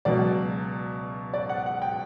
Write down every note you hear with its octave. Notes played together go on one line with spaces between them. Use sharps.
C#2 B2 F#3 D5
D5
F#5
F#5
G5